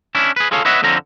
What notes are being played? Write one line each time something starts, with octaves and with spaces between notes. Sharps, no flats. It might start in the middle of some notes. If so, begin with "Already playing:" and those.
C#4 D4 E4
G#4 B4
F4 G#4 A4 C#5 F5
B4 C#5 D#5 E5 F#5
F2 D3 C4 C#4 A#5